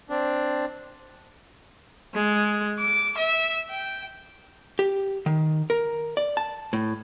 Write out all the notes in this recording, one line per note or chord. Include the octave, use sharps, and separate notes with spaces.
C4 D4
G#3
D6
E5
G5
G4
D#3
A#4
D5
A5
A2